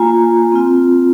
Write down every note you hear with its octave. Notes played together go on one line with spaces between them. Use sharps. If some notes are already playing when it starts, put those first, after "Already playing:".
Already playing: A#3 F4 G#5 A#5
C4 F4